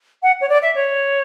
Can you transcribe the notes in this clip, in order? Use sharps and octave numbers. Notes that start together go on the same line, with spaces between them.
F#5
C#5
D5
E5
C#5